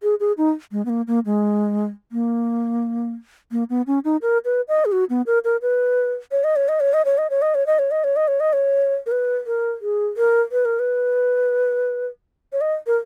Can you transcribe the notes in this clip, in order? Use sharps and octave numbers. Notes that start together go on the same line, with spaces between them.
G#4
G#4
D#4
G#3
B3
A#3
A#3
G#3
A#3
A#3
B3
C#4
D#4
A#4
B4
D#5
G#4
F#4
B3
A#4
A#4
B4
C#5
D#5
C#5
D#5
C#5
D#5
C#5
D#5
C#5
D#5
C#5
D#5
C#5
D#5
C#5
D#5
C#5
D#5
C#5
A#4
B4
A#4
G#4
A#4
B4
A#4
B4
C#5
D#5
A#4